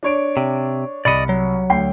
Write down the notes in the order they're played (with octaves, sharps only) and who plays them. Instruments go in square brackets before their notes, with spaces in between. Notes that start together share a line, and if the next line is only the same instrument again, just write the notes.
[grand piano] D4 C#5 D7
[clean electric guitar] C3
[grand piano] C2 B5 C#7 [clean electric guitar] D5 D#5
[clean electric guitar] F#3
[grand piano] D2 G5 C7